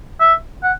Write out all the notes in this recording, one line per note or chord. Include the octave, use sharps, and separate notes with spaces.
E5
F#5